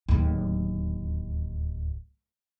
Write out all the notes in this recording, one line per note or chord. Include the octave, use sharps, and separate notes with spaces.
D1 D#2